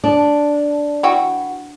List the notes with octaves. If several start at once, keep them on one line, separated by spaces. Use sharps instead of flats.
D4
E3 F#4 G5